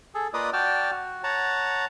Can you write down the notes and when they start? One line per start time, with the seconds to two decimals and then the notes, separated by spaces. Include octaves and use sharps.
0.15 G#4 A4
0.34 A#3 F4 B4 D5 D#5 D#6
0.53 F#4 D5 G5 A5 F6
0.91 F#4
1.24 C#5 F#5 A5 A#5